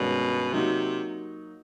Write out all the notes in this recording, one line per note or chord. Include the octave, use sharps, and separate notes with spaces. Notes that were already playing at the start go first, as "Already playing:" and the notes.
Already playing: G2 B2 D#3 G#3 C#4
C3 F#3 A#3 D#4 F#4